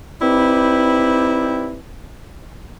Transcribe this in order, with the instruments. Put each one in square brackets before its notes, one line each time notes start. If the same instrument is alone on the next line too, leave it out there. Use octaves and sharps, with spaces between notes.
[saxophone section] C4 D#4 E4 G4 B4 D5